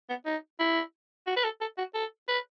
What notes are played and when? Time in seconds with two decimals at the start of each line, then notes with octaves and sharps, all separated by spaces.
0.09 B3
0.26 D#4
0.60 E4
1.27 F#4
1.36 B4
1.44 A4
1.61 A4
1.78 F#4
1.95 A4
2.28 B4